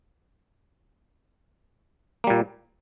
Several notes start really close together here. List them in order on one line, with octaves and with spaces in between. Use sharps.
A#3 G3 A#2